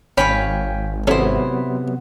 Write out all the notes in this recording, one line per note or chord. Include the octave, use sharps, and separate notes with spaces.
G#1 C#4 C#5 F5 G5 G#5 B5
C3 F#3 B3 C#4 E4 A4 C5